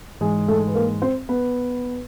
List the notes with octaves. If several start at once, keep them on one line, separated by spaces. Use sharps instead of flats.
G#2 E3 G#3 G#4
A3 A4
B4
A#3 A#4
C4 C5
B3 B4